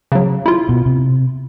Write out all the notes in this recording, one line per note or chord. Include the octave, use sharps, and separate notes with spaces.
C#3 F#3
E4 F4
B2
C3